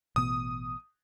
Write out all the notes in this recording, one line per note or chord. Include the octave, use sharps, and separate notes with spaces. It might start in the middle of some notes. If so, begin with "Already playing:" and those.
A1 B2 B3 D#6